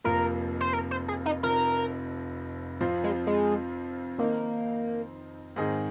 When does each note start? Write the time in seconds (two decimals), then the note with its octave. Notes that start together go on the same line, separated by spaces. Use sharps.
0.04 F1 F2 F3 A#3 F4 A#4
0.60 C5
0.73 A#4
0.91 C5
1.08 G#4
1.26 D#4
1.43 F1 F2 F3 A#4
2.81 F2 F3 C4 F4
3.04 G#3
3.27 G#3
4.18 D#3 A#3 C4 D#4
5.56 G#2 D#3 C4 G#4 D#5